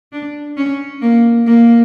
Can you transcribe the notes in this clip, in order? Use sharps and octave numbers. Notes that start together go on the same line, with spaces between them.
D4
C#4
A#3
A#3